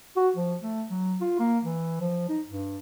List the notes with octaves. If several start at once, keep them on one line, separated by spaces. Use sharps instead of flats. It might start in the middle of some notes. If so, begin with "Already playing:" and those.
F#4
F3
A3
F#3
F4
A#3
E3
F3
D#4
G2